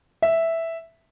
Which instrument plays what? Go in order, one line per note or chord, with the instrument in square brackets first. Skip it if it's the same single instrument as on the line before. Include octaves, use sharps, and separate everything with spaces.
[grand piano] E5